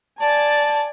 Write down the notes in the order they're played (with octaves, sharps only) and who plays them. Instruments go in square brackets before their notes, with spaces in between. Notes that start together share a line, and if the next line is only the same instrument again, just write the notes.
[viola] D5 G#5 [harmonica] A5